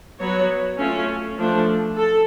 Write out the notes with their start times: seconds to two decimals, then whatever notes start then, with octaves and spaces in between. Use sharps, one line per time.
0.20 F#3 B3 F#4 C#5
0.78 A3 C#4 F4
1.38 F3 A3 D4
1.97 A4